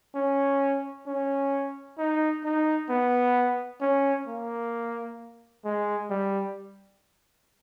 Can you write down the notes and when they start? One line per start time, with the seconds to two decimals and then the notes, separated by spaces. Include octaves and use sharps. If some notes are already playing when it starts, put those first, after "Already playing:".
0.15 C#4
1.07 C#4
1.98 D#4
2.44 D#4
2.89 B3
3.81 C#4
4.27 A#3
5.65 G#3
6.10 G3